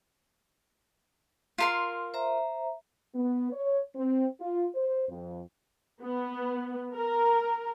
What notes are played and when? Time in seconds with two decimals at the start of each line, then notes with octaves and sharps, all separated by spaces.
1.58 F4 A#4 C6
2.14 C5 E5 A#5
3.15 B3
3.53 C#5
3.96 C4
4.41 F4
4.75 C5
5.09 F2
6.03 B3
6.95 A#4